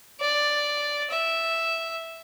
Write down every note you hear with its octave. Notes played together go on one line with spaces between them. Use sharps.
D5
E5